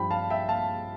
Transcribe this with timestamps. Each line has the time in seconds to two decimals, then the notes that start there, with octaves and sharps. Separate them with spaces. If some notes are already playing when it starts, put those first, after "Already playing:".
Already playing: G2 F3 G5 B5
0.11 F5 A5
0.30 E5 G5
0.49 F5 A5